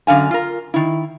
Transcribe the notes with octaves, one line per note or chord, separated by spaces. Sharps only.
F#2 D3 F5 G#5
F4 A#4
D#3 E4